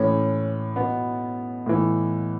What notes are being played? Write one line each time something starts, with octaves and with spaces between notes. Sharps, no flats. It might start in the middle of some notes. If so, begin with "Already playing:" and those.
Already playing: A2 E3 C#4
B2 B3
A2 E3